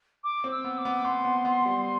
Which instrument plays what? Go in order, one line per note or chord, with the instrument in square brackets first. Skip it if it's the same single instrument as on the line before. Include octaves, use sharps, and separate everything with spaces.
[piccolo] D6
[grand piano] C4
[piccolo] E6
[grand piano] B3
[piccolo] D6
[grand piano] B3
[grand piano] B3 [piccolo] C6
[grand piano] B3
B3
G3